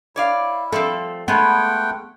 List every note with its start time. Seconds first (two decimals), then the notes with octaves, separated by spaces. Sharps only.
0.16 E4 C#5 D5 F5
0.72 F3 A3 C4 A4
1.28 G#3 A3 B3 C#4 F#5 G5